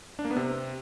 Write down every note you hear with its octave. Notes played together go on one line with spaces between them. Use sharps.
D4
A#3
B3
C3